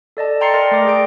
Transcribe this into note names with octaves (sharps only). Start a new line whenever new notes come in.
A4 D5 D#5 A5
G5 A#5 C6 A6 C7 C#7
A#4 D5 D#5 C6
A3 A#4 D6 A#6
G#4 D5 G5 D7